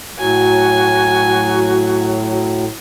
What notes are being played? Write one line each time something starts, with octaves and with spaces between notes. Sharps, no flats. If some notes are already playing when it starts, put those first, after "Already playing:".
A2 F#3 F#4 G#5